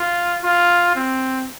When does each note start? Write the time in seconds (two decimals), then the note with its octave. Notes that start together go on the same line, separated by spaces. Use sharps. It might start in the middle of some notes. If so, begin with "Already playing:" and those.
Already playing: F4
0.43 F4
0.95 C4